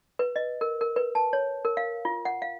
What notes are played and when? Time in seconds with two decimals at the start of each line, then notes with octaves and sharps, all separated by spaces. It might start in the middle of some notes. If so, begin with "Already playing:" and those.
0.19 B4
0.36 D#5
0.61 A#4
0.81 A#4
0.96 B4
1.15 A5
1.33 C#5
1.65 A#4
1.77 F5
2.05 F4
2.25 F#5
2.42 F5